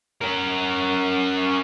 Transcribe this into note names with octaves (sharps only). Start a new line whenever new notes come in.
C#4 A#4